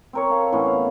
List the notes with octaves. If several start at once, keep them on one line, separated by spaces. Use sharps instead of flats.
C4 A#4 C#5
A4 F5
A2 E3 B3 C#4
F5